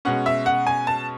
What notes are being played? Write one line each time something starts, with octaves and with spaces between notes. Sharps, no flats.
B2 G#3 C#4 F#5
E5
F#5
G#5
A5